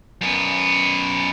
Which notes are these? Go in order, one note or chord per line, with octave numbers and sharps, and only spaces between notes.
F#2 B3